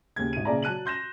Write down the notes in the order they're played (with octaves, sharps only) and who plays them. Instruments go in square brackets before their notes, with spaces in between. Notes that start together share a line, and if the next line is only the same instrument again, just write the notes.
[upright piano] D#2 C#3 G#6
G#1 D#7
A#2 C#3 D5 E5 A#5
F#3 A5 F#6 D#7 F#7
C6 G6 A#6 E7